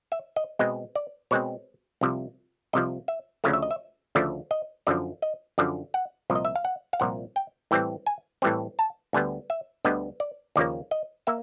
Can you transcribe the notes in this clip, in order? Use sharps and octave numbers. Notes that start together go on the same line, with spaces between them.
E5
D#5
B2 G#3 C4 D#5
D5
B2 G#3 C4 C#5
C2 C3 F3
C2 C3 F3 D#5
E5
D2 C#3 F3 A3 F5
E5
D#5
E5
D2 C#3 F3 A3 D5
D#5
F#2 D3 F3 D5
D#5
F#2 D3 F3 D5
F#5
C2 A#2 F3
D#5
E5
F5
F#5
F5
C2 A#2 F3 F#5
G5
A2 E3 G3 C4 G5
G#5
A2 E3 G3 C4
A5
D2 D3 G3 B3 G#5
E5
D2 D3 G3 B3 D#5
D5
D#2 C#3 F3 A#3 D5
D#5
A#3 E5